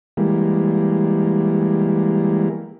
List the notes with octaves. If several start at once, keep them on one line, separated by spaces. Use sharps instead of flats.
E3 G3 G#3 A#3